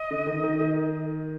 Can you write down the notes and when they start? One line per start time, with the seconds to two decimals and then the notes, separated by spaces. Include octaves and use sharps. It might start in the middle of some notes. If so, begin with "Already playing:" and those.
Already playing: D#5
0.11 D3
0.27 D#3
0.44 D#3
0.61 D#3